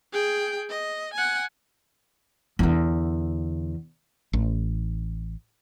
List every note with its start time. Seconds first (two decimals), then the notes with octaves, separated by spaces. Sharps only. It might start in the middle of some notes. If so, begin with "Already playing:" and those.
0.12 G#4 G5
0.69 D#5
1.14 F#5 G#5
2.59 E2 D3
4.33 A1